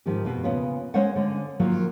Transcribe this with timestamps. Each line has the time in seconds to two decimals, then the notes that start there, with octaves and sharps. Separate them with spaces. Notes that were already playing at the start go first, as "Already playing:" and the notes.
0.06 G#2 D#3 F3 D#4 G4
0.25 F2 B2
0.43 C#3 B3 C#4 F4
0.94 G#3 C#4 C5 C#5 F#5
1.16 D3 G#3 C#4
1.59 D#3 F3 F#3 A#3 F4